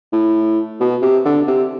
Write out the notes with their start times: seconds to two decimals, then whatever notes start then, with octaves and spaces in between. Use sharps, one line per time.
0.13 A2
0.80 B2
1.02 C3
1.25 D3
1.47 C3